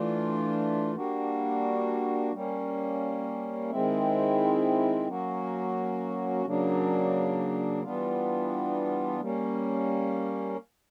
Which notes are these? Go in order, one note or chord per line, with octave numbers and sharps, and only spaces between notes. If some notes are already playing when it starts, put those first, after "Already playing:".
Already playing: E3 A3 D4 F4
G3 A#3 D4 F#4
G3 A#3 C#4
D#3 G#3 C4 E4
F#3 A#3 C#4 F#4
C#3 F#3 A#3 D4
E3 G3 B3 D4 F4
G3 A#3 C#4